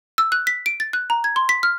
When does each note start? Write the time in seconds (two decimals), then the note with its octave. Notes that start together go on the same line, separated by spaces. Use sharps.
0.18 E6
0.32 F#6
0.47 B6
0.66 D7
0.80 A6
0.93 F#6
1.10 A#5
1.24 G#6
1.36 C6
1.49 B6
1.63 F6